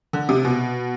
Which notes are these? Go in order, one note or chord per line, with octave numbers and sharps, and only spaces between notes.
D3
C3
B2